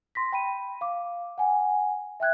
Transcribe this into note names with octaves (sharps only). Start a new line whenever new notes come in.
C6 A#6 B6
G5 B5 D#7
F5 D6
F#5 G#5
E5 G5 F#6 G#6